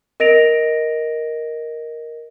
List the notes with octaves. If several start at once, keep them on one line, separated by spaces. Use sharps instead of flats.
A#4 D#5 A#6 D7 F7